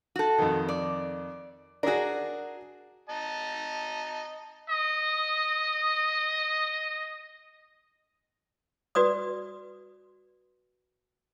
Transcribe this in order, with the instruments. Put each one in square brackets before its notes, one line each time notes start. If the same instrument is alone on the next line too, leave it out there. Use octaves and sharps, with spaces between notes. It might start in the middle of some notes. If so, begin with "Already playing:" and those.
[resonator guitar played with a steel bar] F#4 A4
[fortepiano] F2 D#3
[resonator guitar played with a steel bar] D5
[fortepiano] D4 G#4 [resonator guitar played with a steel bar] F#4 A#4
[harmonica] D#5 A5 A#5
[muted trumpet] D#5 [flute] D#6
[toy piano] F#4 B4 D5 D#6